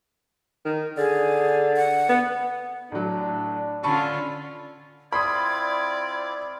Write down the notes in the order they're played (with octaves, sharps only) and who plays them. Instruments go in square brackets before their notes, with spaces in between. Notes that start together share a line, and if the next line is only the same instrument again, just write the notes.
[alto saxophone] D#3
[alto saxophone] D3 [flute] G#4
[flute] F#5
[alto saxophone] B3
[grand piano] A2 F#3 [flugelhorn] D4
[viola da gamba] D3 C#4 F4 [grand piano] A5 B5 C#6
[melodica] C4 E4 F4 [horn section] D5 [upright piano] B5 C6 D#6 [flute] G#6